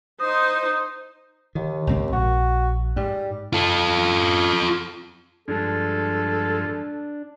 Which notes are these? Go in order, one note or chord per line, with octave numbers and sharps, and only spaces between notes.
D#4 C5 D#6
D#2 D#3
C#2 G#2 C4
A#1 F#4
G#2 G3
F4 A4
G2 F3 G#3 D4 A4